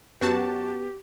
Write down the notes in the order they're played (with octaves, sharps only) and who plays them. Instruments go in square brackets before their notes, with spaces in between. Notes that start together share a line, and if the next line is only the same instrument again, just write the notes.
[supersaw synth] F#2 F#4 A5 [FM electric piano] B3 [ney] G4